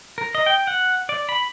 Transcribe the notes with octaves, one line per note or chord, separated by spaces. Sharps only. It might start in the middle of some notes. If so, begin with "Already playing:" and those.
A#4
D#5
G5
F#5
D5
B5